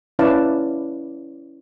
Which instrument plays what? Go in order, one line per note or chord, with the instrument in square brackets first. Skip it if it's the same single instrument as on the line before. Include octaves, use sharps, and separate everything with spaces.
[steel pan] C#4 E4 B4 D5 F5 A5